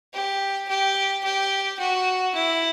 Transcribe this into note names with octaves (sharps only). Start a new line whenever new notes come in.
G4
G4
G4
F#4
E4